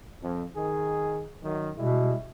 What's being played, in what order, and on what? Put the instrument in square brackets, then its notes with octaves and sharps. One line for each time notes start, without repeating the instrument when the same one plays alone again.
[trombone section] F2
D#3 G#4
F#2 D#3
[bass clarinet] B2 [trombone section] G3 G#3 E4